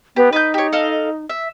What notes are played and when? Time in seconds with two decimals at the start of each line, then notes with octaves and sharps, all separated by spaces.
0.16 B3 G4
0.33 D#4 B4 G6
0.54 G4 C#5
0.72 A4 D#5 F5
1.30 E5